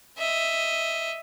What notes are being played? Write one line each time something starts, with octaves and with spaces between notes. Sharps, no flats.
D#5 E5